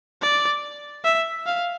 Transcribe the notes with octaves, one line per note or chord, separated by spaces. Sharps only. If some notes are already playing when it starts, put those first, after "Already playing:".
D5
E5
F5